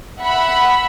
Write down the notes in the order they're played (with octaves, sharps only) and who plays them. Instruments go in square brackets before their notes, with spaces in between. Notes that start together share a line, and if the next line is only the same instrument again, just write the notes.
[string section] E5 F#5 B5